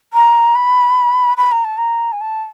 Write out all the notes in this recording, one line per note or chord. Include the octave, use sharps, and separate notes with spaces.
A#5
B5
B5
A#5
A5
A#5
G#5
A5